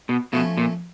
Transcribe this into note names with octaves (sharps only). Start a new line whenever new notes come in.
B2
B2 F3 A3 C#4
A#2